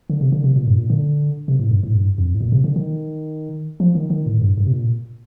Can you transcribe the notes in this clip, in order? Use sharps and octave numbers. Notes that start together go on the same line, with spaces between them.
D3
C3
D3
C3
A#2
G2
A#2
D3
C3
A2
G2
A2
G2
F2
A2
A#2
C3
D3
D#3
F3
D#3
D#3
A2
G2
G2
C3
A#2